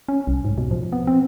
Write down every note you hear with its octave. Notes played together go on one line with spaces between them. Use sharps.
C#4
C2
G#2
B2
F3
B3
C4